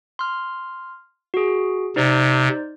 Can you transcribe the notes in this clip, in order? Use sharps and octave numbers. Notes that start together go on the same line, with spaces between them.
C6 F6
F#4 G#4
C3 D#4 C5 D5